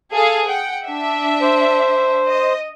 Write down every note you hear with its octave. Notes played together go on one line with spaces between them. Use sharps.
G#4 A4 F5
F#5 G5
D4 E5
C5
D#5